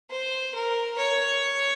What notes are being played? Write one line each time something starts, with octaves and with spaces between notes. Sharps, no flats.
C5
A#4
C#5